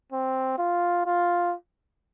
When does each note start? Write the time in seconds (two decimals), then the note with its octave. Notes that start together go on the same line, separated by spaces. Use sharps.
0.12 C4
0.59 F4
1.06 F4